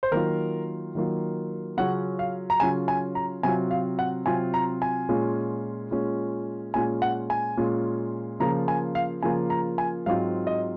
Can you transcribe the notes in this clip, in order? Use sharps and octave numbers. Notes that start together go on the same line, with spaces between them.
C5
D#3 F#3 A#3 F4 A#4
D#3 F#3 A#3 F4
C#3 F#3 C#4 F4 F#5
F5
A#5
C#3 F#3 C#4 F4 G#5
G#5
A#5
C3 F#3 C4 F4 G#5
F5
F#5
C3 F#3 C4 F4 G#5
A#5
G#5
A#2 G#3 C#4 F4
A#2 G#3 C#4 F4
A#2 G#3 C#4 F4 G#5
F#5
G#5
A#2 G#3 C#4 F4
C#3 F3 A#3 F4 A#5
G#5
F5
C#3 F3 A#3 F4 G#5
A#5
G#5
G#2 F#3 C4 F4 F5
D#5